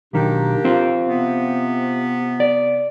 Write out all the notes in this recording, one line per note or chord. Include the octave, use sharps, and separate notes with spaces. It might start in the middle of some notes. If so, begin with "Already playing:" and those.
B1 D#3 A#3 D4 G4
C4 F4
C3 B3
D5